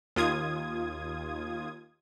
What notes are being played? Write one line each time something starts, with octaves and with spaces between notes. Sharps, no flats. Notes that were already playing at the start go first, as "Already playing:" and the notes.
D#2 F4 D#6 G#6